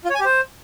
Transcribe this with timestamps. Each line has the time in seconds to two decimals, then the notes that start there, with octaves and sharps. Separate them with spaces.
0.05 F4
0.10 C#5
0.15 G#5
0.20 G4
0.25 C5